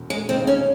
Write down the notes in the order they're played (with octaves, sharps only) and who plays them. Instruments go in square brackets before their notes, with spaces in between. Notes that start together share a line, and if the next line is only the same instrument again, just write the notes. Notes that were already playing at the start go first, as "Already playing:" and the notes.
Already playing: [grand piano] E1
[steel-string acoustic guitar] G#3
[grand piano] D#2 C#3 G#3 D#4 [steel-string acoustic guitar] C4
[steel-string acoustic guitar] C#4